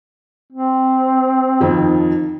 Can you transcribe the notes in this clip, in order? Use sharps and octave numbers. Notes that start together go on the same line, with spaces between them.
C4
F2 D#3 F3